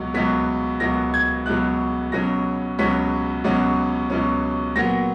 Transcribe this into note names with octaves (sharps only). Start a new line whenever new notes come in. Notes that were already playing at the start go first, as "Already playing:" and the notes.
Already playing: C#2 B2 F#3
C#2 B2 F#3 B6
C#2 B2 F#3 A#6
G#6
C#2 B2 F#3 F#6
C#2 B2 F#3 C#4 A#6
C#2 B2 F#3 C#4 B6
C#2 B2 F#3 C#4
C#2 B2 F#3 C#4
A#2 F#3 B3 A#6